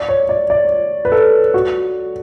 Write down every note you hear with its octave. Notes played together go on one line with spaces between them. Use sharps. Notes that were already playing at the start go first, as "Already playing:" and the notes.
Already playing: D5
C#5
D5
D5
B4
A4
F#4